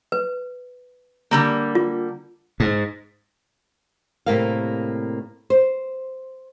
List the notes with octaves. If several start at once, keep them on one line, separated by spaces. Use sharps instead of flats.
B4
D3 G3 A#3
F4
G#2
A2 C3 G3 A#3 A#4 F5
C5